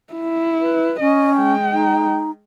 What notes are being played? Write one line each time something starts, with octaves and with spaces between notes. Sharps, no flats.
E4
B4
C#4 D#5
G#3 G5
D#4